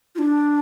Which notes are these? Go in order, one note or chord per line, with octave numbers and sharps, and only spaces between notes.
F4
D4